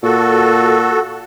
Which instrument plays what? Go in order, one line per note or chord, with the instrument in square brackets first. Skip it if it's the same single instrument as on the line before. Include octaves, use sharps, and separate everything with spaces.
[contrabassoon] A#2 [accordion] F#4 A4